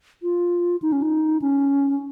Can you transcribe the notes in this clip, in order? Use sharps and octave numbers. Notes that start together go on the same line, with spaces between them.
F4
D#4
C#4
D#4
C#4